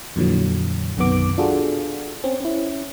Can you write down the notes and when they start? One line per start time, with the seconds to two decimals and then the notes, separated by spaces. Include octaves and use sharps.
0.16 F2 A#2 D3 E3 F#3
0.97 B1 F#2 C3 D#3 B3 D6
1.38 D4 F4 F#4 G#4 A4
2.24 C4 C#4
2.40 C#4 E4